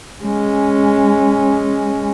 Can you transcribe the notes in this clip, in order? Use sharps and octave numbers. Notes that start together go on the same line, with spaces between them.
G#3 C#4